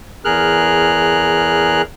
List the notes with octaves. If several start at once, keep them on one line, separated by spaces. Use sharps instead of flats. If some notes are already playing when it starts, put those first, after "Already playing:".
E2 G#4 A#4 F6 F#6